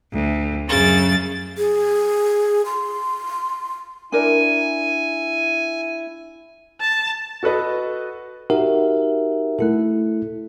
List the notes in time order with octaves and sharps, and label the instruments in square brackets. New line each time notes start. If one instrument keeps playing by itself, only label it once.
[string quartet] D2
F#2 C#3 A6
[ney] G#4
C6
[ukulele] D4 A#4 D5 [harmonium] E4 [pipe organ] G#5
[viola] A5
[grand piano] F#4 A4 B4 D#5
[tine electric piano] D#4 F#4 G4 A#4 E5 F#5
A3 E4 A4